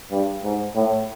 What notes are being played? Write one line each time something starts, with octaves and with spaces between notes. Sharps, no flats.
G2
G#2
A2